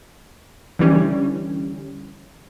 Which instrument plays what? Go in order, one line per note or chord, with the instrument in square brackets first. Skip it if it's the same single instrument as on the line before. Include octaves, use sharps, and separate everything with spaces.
[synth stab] D3 E3 G3 C#4